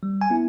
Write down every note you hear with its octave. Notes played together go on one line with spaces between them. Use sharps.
G3
G#5
B3 E4